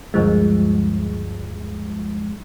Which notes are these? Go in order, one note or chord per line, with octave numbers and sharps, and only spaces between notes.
D2 G2 F3 G#3